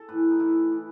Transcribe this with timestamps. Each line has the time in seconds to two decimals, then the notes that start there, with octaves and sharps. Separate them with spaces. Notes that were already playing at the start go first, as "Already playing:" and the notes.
Already playing: A4
0.09 A2 E3 B4
0.31 D#4
0.39 A2 E3 E4
0.71 E3